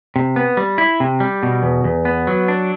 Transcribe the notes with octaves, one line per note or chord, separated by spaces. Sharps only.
C3
B3
G3
E4
C3
G3
B2
E2
E2
B3
F#3
D4